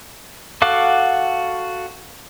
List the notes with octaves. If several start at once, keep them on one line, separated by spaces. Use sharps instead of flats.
F#4 A4 F5 F#5 D6